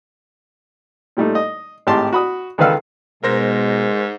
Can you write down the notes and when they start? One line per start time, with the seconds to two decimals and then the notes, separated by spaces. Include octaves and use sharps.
1.17 A#2 G3 A3 D#4
1.35 D#5
1.87 G#1 A2 G4 A5 C6
2.13 F#4 B5 D#6
2.58 C#2 D#3 A4 B4 F5 E6
3.23 G#2 B2 G#3 A#4 C5 A#6